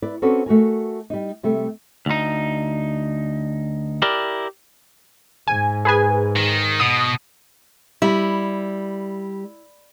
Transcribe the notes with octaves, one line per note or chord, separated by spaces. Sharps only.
E4 B4 D5
C4 C#4 F#4 A4 B4 D5
A3 F#4 A#4 G#5
G3 D#4
C3 G3 A3
D2 D#4
E4 G4 A#4 D5
G#2 G#5
G#4 B4 G#5
D#3
B2 D#6
G3 E4